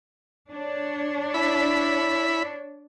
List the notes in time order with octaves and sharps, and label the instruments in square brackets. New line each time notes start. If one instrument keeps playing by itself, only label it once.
[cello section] D4 C#5
[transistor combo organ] E4 B5